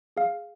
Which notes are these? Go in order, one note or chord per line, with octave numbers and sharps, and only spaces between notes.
G#4 F5